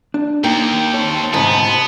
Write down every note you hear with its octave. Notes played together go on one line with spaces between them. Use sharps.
D4
D#2 A#3 D#4 G5
C4 C#5 A5
D2 G#2 C3 B3